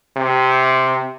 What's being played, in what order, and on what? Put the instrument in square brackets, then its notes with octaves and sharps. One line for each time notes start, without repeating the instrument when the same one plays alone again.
[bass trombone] C3